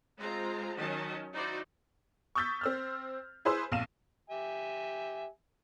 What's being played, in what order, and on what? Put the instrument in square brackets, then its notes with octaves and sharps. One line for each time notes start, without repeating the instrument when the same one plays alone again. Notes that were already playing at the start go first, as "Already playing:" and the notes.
[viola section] G#3 C4 F4 A#5
D#3 F#3 C#4 D#5 A5
D#4 E4 F#4 C5 D5
[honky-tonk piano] C#6 D#6 E6 G6 A6 B6
C4 E6 F6
E4 G#4 B4 C5 C6 E6
A#1 F2 F5 D#7 E7
[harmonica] G4 E5 G#5